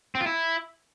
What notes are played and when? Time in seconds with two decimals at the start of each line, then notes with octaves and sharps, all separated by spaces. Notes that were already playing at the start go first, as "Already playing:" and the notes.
0.15 C4
0.21 F4
0.26 E4